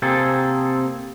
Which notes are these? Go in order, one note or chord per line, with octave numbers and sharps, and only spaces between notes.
C3 A#3 C4 G#4 A4